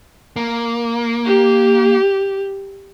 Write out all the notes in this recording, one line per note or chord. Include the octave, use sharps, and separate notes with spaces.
A#3
G4